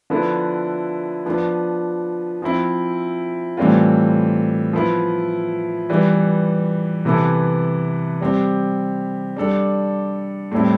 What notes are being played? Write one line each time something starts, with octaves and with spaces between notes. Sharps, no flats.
D3 F3 B3 E4
F3 B3 D4
F3 C4 E4
A2 E3 G3 C4 F4
F3 B3 E4
E3 G3 B3
C3 E3 B3 E4 A4
G3 C4 G4
G3 D4 A4
A2 G3 C4 E4